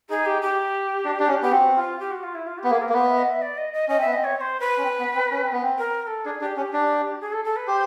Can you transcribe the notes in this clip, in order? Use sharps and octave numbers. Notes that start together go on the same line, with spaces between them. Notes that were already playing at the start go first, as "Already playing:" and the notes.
D#4 G#4
G4
G4
D4
D4
C#4
B3 G4
C4 F#4
F4
G4
F#4
F4
E4
F4
G4
B3
A#3 G#4
A#4
A#3
B3 C5
E5
D#5
E5
D5
D#5
D#5
C#4 D#5
C4 E5
B3
C4 D#5
C#5
C#5
C5
B4
C#4
C4
B3
C4
C#4
C4
B3
C4
A#4
A#4
A4
D4 G#4
D4 G4
C#4 G4
D4
G#4
A4
A4
B4
G4 C5